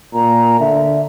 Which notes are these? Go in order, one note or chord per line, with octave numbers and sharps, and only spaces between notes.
A#2 A#5
D3 E5